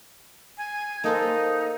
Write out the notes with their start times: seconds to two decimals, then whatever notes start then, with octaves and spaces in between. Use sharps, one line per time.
0.57 G#5
1.04 A#3 D#4 A4 C5